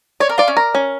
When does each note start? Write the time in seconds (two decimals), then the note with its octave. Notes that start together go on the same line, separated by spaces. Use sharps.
0.20 C#5 D5
0.29 A#4
0.38 F4 D5
0.48 C#4
0.57 A#4
0.75 C#4